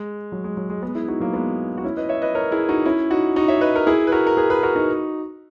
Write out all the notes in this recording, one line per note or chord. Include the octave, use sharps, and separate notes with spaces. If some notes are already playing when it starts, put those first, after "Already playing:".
Already playing: G#3
F#3
G#3
F#3
G#3
G#3 B3
E4 G#4
D#4 F#4
F#3 A#3
G#3 B3
F#4
C#4 E4
B4 D#5
C#5 E5
B4 D#5
A#4 C#5
E4 G#4
D#4 F#4
C#4 E4
D#4 F#4
D#4 F#4
C#5 E5
B4 D#5
A#4
E4 G#4
B4
F#4 A#4
A#4
G#4 B4
G#4 B4
F#4 A#4
D#4 F#4